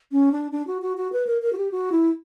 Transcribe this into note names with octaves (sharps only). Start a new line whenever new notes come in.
C#4
D4
D4
F#4
F#4
F#4
B4
A#4
A#4
F#4
G4
F#4
E4